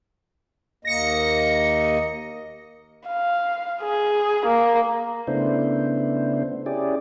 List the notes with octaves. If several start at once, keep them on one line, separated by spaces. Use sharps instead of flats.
D#2 A#3 D#5 A#6 C#7
F5
G#4
A#3
C#3 A3 B3 D4 E4 C5
C#4 E4 G4 G#4 D5